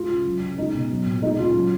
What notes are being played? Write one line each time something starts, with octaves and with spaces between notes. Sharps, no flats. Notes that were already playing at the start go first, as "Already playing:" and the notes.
Already playing: G#3 F4
C#3
F#3
C#3
G#3 D#4
B2
F#3
A#2
G#3 D#4
C#3 F4
F#3